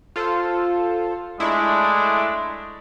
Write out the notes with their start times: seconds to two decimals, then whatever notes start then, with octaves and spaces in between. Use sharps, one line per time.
0.16 F4 A4 C5
1.40 G#3 A3 D4 E4